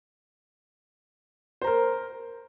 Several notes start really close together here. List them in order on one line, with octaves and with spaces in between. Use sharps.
C5 A#5 A#4